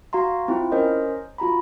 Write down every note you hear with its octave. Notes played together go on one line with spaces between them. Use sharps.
F#4 F5 A#5 C6
C4 E4 F4
C#4 A#4 C5 D#5
F4 F#4 A#5 B5